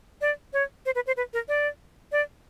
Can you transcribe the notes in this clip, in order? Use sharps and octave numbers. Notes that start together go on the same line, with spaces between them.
D5
C#5
C5
B4
C5
B4
A#4
D5
D5